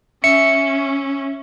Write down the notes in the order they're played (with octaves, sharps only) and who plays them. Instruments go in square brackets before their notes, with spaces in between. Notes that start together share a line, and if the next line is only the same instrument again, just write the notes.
[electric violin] C#4 [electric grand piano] E5 [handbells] C#7